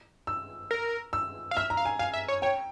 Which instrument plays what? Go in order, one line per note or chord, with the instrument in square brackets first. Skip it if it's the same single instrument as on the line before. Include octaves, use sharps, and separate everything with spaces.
[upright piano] E6
[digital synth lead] A#4
[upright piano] E6
[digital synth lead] F5
[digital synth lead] E5 [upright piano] F6
[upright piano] A#5
[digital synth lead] F5
[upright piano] G#5
[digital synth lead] F5 [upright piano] G#5
[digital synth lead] E5
C#5
[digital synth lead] C#5 [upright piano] G5